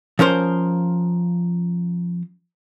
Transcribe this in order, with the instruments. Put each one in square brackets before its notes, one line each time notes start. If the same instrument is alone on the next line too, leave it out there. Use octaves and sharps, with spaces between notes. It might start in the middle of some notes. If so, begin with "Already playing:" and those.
[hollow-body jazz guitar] F3 C#4 A#4 C5